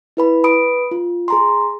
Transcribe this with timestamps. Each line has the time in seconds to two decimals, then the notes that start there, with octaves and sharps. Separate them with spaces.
0.17 E4 B4 B5
0.44 B4 B5 D#6 D7
0.91 F4
1.28 G#4 A#5 C6